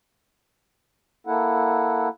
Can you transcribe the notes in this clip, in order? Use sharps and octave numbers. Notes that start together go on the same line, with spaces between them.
A#3 E4 A4 F#5